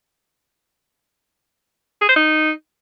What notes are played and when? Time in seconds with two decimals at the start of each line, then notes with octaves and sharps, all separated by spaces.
2.01 G#4
2.09 C5
2.16 D#4